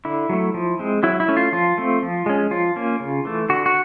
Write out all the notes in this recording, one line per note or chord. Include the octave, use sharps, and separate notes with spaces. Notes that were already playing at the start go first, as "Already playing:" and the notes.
D3 E4
F#3 A3
F3
G#3 C4
F#3 E4
E4
A3 C#4
F4
F3 F4
A3 C4
F3
G#3 C#4
F3 F4
A#3 C#4
C#3
E3 A3
D3 F#4
F#4